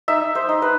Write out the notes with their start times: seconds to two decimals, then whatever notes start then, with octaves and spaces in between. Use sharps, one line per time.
0.08 D#4 E5
0.35 C5
0.49 D#4
0.62 B4